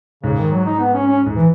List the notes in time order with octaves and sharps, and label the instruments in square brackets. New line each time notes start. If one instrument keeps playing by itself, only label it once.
[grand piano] G#2 [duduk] C#3
[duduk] D#3
F#3
D#4
B3
C#4
C#4
[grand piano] G#2
[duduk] E3